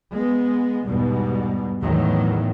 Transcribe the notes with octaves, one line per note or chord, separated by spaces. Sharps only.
G#3 B3
E2 G#2 B2 G3
E2 A2 D#3 F#3